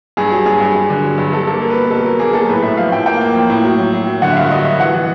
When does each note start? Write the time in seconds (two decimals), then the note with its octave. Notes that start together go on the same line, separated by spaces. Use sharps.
0.17 G2 G#4
0.32 F#3
0.46 G2 G#4
0.61 G2
0.75 G2
0.90 D3
1.04 F#3
1.18 G2
1.33 F#3 A4
1.47 A#3 A4
1.62 A#3 A#4
1.70 B4
1.76 B2 A#4
1.91 B2 A4
2.05 F#3 A#4
2.19 A#3 G#4
2.33 F#3 A4
2.49 A2 B4
2.62 A2 E5
2.77 F3 F5
2.92 A2 G5
3.06 A#3 G5
3.21 A#3
3.35 F3
3.50 A2
3.64 F#3
3.79 F#3
3.93 F#3
4.07 F#3
4.22 D3 F#5
4.32 E5
4.36 G2 F5
4.51 F#3 D#5
4.65 G2 E5
4.80 E3 F#5
4.94 E3